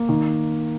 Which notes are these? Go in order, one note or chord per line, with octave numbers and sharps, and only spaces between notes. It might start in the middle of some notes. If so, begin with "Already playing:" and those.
Already playing: A#3
D#3